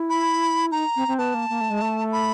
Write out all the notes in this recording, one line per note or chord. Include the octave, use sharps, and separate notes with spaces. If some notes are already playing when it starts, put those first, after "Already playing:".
Already playing: E4
B5
D#4 A#5
C4
C4
B3 A5
A#3
A#3
A3
G#3
A3
B5